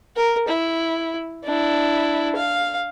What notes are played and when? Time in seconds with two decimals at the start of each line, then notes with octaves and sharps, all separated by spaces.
0.16 A#4
0.48 E4
1.44 D4 E4
2.36 F5